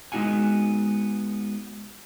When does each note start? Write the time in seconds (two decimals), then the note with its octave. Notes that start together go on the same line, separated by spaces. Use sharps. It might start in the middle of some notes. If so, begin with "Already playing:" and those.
0.12 G#3 B3 D#4 F#4 F#5 G#5